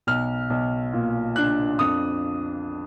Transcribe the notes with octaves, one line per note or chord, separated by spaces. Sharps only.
B1 F6
B1
A#2
D4 F#6
F2 D#6